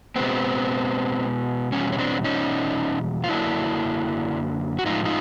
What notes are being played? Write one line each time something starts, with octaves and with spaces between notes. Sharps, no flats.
B2 G#3 B3 C4
E2 B2 G3 C#4
C#4
C4 D4
C#4 D#4
F4
F#2 D3 F#3 A#3 D4 E4
F#4
A2 F3 G#3 D#4 F4
D#4 F4